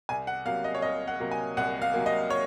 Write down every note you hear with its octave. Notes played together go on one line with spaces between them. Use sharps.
C2 G#5
F#5
C3 F#3 A#3 F5
D#5
C#5
C2 D#5
F#5
C3 F#3 A#3
G#5
C2 F#5
F5
C3 F#3 A#3
D#5
C#5